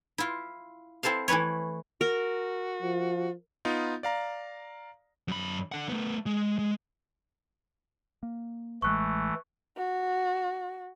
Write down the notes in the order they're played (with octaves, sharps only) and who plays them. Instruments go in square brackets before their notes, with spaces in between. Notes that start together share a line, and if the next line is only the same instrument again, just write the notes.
[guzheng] E4 F4
C4 E4 A4 C5 F5
E3 A3 E4 B4 C#5
[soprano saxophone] F#4 [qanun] A#4
[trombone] F3
[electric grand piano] B3 D#4 F4
D5 F5 A#5
[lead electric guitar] F#2 B5
D3 F#5
A3 B3
G#3
G#3
[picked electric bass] A#3
[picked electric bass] A1 G#3 [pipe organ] E3 A3 [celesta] C#6 F#6
[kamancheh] F#4